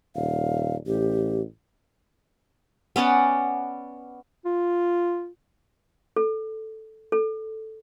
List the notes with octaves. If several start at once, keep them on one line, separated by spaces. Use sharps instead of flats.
D#1 F5
A1 G4
B3 C#4 D5 F#5
F4
A4
A4